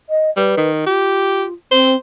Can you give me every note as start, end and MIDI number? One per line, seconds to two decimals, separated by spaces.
0.09 0.30 75
0.37 0.54 55
0.37 0.69 71
0.57 0.86 51
0.86 1.53 65
0.86 1.45 67
1.71 1.95 60
1.71 1.95 72